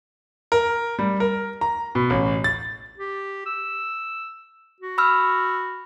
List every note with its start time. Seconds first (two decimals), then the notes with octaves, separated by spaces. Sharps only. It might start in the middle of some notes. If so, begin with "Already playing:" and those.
0.52 A#4
0.99 G3
1.20 A#4
1.61 A#5
1.95 B2
2.10 A1
2.44 A6
2.98 G4
3.46 E6
4.80 F#4
4.98 B5 E6 F6